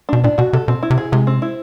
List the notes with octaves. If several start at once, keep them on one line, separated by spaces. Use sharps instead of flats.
B2 D4
A#2 D4
B2 F#4
C3 A4
B2 C4
E4
C3
G#4
C3 G#3
C4
E4